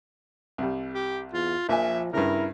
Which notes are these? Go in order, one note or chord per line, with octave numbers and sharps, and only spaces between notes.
C2 G3
G4
E2 F4
A#1 A#2 F3 E5 G#5
G2 C#3 E4 A#4